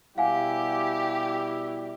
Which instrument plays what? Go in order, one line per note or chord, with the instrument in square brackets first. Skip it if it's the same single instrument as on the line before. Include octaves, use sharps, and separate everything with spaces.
[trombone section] B2 G3 E4 [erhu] G4 [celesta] F5 F#5 G#5